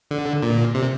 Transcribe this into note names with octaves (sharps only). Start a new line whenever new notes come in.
D3
A#2
C3